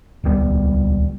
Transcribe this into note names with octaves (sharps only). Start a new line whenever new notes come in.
D#1 C#2 G3 B3